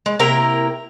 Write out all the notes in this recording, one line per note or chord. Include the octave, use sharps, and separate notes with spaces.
G#3
C3 A#3 E4 A#4 G5 A#5